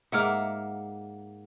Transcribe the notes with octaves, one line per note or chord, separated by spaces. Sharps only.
G#2 A#3 E5 F#5 D6 F6